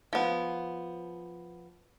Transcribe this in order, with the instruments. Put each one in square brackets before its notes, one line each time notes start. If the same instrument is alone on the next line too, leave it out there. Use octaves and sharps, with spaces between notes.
[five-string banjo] F3 B3